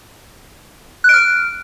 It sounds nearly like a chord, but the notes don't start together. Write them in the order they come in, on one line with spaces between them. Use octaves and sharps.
F#6 D7 F6